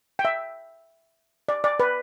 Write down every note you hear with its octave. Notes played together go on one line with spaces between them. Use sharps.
G5
E5
D5
D5
B4